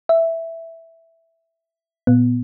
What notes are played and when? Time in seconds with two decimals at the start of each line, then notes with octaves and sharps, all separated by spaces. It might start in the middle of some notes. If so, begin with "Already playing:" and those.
0.09 E5
2.07 A#2 B3